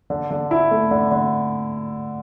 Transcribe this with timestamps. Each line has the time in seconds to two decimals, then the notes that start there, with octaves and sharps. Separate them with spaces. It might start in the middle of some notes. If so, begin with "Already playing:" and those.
0.10 D3
0.31 D3
0.51 E4
0.71 A3
0.91 D3
1.12 D3